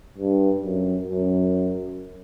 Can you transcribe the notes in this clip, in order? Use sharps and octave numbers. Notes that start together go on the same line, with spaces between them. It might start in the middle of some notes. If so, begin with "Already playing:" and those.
G2
F#2
F#2